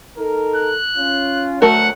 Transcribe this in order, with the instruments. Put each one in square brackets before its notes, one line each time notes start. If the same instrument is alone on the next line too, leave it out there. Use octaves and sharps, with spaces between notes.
[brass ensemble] D#4 A4 A#4
[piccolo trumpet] F#6
[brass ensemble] C#4 F4
[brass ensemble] D2 F#3 [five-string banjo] A3 F#4 A#4 [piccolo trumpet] F#5